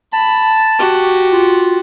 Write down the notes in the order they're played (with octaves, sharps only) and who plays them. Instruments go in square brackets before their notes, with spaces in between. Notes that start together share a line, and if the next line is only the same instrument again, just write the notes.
[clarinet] A5 [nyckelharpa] B5
[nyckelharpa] F#4 G4
[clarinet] F4